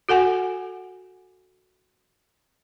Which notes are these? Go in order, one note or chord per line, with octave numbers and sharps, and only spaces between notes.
F#4 A4 F#5 G#5